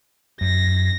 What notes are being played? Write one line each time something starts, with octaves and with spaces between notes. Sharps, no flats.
F#2 A#6